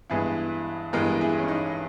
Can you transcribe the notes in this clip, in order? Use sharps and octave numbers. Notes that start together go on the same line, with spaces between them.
G2 E3 G#3 B3 E4 G#4
G2 E3 G#3 B3 G4 A#4
E4 G#4
C#4
D#4